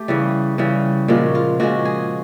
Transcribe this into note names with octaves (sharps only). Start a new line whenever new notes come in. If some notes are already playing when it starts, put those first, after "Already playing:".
Already playing: A3 G4
C#3 E3 G3
C#3 E3 G3
A#2 F3 G#3 F#4
F4
A#2 F3 G#3 F#4
G#4